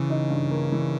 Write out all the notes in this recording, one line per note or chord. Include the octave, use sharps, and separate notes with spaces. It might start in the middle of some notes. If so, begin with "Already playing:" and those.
Already playing: C#3 E3
D#4
G2
A#3
E3